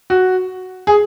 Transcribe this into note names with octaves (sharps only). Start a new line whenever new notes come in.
F#4
G#4